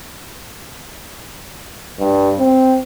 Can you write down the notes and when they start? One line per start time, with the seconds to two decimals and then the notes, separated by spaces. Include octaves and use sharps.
1.99 G2
2.39 C4